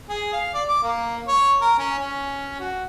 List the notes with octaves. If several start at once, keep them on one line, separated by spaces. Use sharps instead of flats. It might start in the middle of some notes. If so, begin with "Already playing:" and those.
G#4
F5
D5
D6
A#3
C#5
A#4
C#4
C#4
F#4